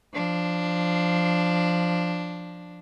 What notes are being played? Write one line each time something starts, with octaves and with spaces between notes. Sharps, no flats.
F3 D4